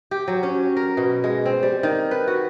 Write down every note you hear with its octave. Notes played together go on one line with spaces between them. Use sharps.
G4
F#3
C#4
A#4
B2
G#3
C4
G3
D#3
B4
F#4